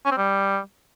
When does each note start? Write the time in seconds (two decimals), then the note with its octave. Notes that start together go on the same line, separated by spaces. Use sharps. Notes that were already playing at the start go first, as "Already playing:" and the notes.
0.05 C#4
0.11 C4
0.17 G3